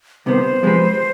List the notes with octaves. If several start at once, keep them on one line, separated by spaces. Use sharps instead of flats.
C2 C3 D#3 B3 C5
F3 G#3 C4 G4 B4